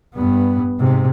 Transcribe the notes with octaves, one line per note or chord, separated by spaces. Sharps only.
G2 B3
G#2 C3